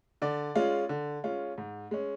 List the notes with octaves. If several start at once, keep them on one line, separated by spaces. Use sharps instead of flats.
D3 D5
G#3 C#4 F4
D3
G#3 C#4 F4
G#2
G#3 C#4